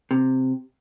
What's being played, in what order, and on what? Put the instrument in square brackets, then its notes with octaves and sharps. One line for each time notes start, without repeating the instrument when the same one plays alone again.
[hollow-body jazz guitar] C3